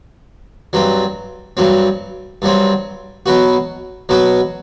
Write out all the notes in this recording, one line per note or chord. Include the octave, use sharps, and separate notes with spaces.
G2 F#3 C4
G2 F#3 C4
G2 F#3 C4
B2 F#3 B3 F#4
B2 F#3 B3 F#4